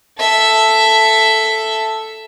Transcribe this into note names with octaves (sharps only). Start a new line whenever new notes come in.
A4 E5